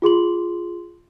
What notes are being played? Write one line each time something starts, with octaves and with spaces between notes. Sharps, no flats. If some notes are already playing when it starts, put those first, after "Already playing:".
F4 G#4 C6 F#7